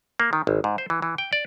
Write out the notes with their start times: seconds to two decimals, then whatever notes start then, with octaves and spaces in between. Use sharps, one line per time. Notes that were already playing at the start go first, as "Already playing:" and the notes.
0.20 A#3
0.33 D#3
0.47 G#1
0.64 G#2
0.78 C5
0.90 E3
1.02 E3
1.18 G5
1.33 D5